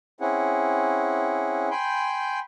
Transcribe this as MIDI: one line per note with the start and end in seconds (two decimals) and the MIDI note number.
0.21 1.69 60
0.21 1.69 61
0.21 1.69 64
0.21 1.69 68
0.21 1.69 78
1.71 2.39 79
1.71 2.39 80
1.71 2.39 83
1.71 2.39 84
1.71 2.39 91